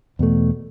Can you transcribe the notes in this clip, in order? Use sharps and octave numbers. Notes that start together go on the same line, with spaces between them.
E2 B2 A3